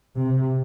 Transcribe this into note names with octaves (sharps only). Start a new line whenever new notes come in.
C3